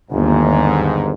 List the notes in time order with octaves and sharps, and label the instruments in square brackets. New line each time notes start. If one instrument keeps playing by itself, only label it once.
[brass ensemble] G1 G#2 [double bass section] D#2